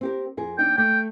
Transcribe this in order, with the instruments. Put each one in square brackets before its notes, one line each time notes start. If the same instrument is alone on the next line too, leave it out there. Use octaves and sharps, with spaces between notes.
[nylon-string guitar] C4 G4 A#4
F2 G#4 A#4
[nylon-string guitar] D#2 D4 D#4 [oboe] G5
[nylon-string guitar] A3 [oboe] G5